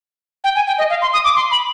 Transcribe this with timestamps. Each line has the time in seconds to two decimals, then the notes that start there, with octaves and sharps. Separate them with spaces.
0.44 G5
0.56 G#5
0.67 G5
0.78 D#5
0.90 F5
1.02 C6
1.13 D#6
1.25 D6
1.36 C6
1.51 B5